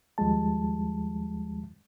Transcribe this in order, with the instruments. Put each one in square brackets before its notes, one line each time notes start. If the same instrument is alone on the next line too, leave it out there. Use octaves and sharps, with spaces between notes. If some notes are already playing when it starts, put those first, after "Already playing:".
[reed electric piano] D#2 F3 G3 G#3 A5